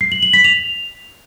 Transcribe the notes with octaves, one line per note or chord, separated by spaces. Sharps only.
C7
F#7
F#7
B6
F7